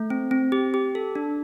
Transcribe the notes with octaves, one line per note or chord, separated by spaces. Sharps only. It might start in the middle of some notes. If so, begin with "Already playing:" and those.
Already playing: A3
C4
C4
G4
G4
A4
D4